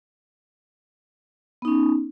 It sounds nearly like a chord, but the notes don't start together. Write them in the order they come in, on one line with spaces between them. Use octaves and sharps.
B3 D#4 C#4